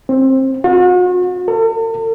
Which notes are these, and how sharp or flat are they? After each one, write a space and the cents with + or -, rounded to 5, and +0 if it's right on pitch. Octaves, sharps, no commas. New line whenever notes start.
C4 +20
F#4 -40
A4 +45